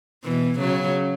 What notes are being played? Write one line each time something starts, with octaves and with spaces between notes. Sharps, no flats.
B2 E3
C#3 F#3